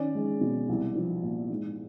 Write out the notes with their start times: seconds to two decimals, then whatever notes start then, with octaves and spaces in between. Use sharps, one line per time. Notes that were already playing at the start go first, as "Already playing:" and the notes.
Already playing: D#3 C#4 D5
0.15 G#3
0.41 B2
0.69 C2
0.95 F3
1.23 A#2
1.50 G#2